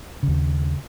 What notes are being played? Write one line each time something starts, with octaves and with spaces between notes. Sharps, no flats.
D#2 C#3